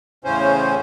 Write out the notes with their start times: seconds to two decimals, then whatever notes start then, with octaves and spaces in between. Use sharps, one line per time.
0.24 E2 A2 C#3 C#4 C5